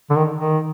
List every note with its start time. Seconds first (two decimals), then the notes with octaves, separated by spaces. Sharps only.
0.10 D3
0.16 D#3
0.38 D#3